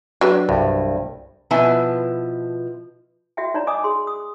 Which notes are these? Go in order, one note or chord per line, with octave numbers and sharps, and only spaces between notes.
F#3 D4 B4
C2 G2
B2 F3 E4 B4 G#5 A5
F#4 E5 G5
D#4 C#5 D5 A#5
D#5 G#5 D6 D#6
G#4 C6
D#6